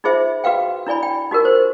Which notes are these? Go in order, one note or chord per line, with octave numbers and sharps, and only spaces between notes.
D#4 F4 G#4 C5 E5
F#4 B4 F5 G5
D4 E4 D5 G#5 B5
G5
D#4 F#4 G4 A#4
C5